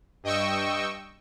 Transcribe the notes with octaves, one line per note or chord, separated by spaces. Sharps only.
G2 D#5 G5 C#6 E6